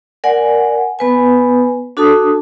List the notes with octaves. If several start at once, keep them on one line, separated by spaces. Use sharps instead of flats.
A#4 D5 F#5 G#5
B3 B4 G#5
D4 F#4 A4 A5 D#6